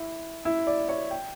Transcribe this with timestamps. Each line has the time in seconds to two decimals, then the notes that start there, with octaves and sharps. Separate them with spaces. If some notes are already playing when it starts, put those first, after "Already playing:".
Already playing: E4
0.45 E4
0.67 D5
0.89 C#5
1.11 G5